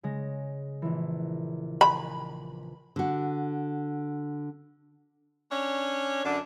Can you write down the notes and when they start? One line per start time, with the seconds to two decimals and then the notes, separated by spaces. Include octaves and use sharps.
0.03 C#3 G#3 A#6
0.82 A#1 E3
1.81 G#5 B5
2.96 D3 F#4
5.50 C#4 D4 C#5
6.24 F#2 D3 D4